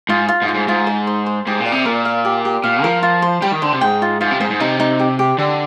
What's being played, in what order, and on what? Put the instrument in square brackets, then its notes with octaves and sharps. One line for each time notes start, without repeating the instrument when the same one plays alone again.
[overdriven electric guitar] G#2 [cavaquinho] F4
[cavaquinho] F4
[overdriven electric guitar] G#2
[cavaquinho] F4
[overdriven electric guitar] G#2
[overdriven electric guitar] G#2 [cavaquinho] F4
[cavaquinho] C5
C5
C5
[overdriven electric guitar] G#2 [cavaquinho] G4
[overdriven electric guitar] A#2
[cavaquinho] D5
[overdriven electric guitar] C3
[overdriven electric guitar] A#2 [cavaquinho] A#4
[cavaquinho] F5
G4
G4
[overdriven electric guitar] A#2 [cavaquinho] F5
[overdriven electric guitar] F3 [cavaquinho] A#4
[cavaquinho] F4
C5
[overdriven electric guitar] G3 [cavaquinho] G5
[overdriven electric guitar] D#3
[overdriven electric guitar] D3 [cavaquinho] C5
[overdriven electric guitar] C3
[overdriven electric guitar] G#2 [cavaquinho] G5
[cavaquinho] F4
[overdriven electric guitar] G#2 [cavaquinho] F4
[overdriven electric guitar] C3
[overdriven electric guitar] G#2 [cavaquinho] C5
[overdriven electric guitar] G#2
[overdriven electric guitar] C3 [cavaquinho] D#4
[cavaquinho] D#4
G4
G4
[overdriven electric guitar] D3 [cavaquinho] G4